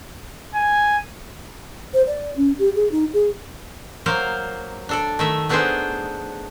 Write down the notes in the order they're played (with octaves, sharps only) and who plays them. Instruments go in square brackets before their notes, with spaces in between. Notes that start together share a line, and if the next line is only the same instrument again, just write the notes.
[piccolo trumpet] G#5
[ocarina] C5
D5
C#4
G4
G#4
D#4
G#4
[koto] F#3 A#3 A#4 C5 F5
D4 A4 D5
D#3 A3 E5
A3 B3 D4 D#4 G#4 C5